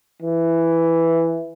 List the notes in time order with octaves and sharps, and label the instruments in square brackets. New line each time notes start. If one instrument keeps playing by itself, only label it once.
[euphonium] E3